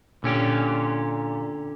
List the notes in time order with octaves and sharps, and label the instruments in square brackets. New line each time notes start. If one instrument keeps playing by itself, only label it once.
[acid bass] A#2 [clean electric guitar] D3 C#4 G4